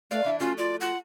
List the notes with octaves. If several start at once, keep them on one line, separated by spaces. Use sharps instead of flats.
A3 B4 D5 F5
E3 D4 E4 E5
F3 A3 C#4 F4 F#4
F4 D5
F4 F#5